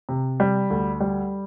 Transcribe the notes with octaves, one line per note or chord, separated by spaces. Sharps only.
C3
G3
D2
G3